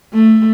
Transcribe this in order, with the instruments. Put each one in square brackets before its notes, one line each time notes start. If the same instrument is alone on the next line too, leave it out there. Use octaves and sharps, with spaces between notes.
[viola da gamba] A3